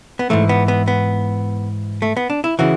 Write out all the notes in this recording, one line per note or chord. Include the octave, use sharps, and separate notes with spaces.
B3
G#2 E3 A3
B3
B3
B3
A3
B3
D4
E4
C#3 E3 F#4